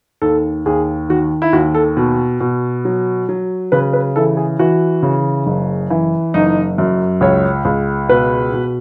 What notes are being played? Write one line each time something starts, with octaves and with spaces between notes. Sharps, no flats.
D#2 A4
D#2 G#4
D#3 F#4
E4
D#2 F#4
A4
B2
B2
F#3
F#3
C#3 B4
B4
E3 A4
G#4
E3 F#4
C#3
F#1
E3
F#1 D#4
F#2
C#2 C#5
C#2
B2 B4
B2